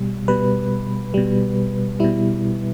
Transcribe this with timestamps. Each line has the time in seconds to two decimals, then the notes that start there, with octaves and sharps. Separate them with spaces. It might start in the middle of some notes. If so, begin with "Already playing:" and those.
Already playing: B2 G3
0.28 B2 G3 B4
1.14 B2 G3
2.00 B2 G3 E4